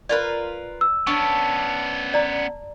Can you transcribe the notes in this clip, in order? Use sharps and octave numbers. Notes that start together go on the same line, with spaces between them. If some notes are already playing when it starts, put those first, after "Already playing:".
F4 A#4 B4 D5
E6
B3 C#4 D4 C#6
D5 A#5